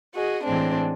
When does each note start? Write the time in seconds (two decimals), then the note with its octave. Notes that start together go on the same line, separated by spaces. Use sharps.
0.15 F#4 G#4 D#5
0.43 A2 E3 G#3 C4 D4